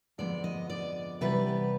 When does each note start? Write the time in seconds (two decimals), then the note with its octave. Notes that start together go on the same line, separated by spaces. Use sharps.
0.18 F2 D3 F3 G#3 B3 D5
0.44 D#5
0.70 D5
1.21 C3 E3 G3 B3 B4